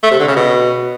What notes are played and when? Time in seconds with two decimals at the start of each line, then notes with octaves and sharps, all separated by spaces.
0.03 A3
0.11 C3
0.19 D3
0.27 C#3
0.36 B2